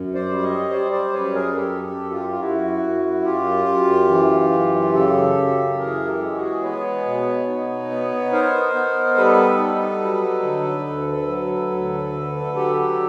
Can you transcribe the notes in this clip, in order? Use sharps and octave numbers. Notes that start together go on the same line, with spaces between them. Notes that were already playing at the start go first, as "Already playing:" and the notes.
Already playing: F#2
C5 D5
G3
C#5 D#5
G3 C5 D5
C5 D5
F#2 B4 C#5
G#4 A#4
F#2 G4 A4
G4 A4
F#2
F4 G4
F4
F#2 E4 F#4
F#2
F#2 F4 G4
F#2
E3
F#2
C#3 G4 A4
F#2
E3 G#4 A#4
G4 A4
G#3
F#4 G#4
B3 B4 C#5
B2
D#4
B3
D#4 A#4 C5
B3
G3 A4 B4
D#4
F#3
D3
D2
F#3
D2
D3
F#3 G4 A4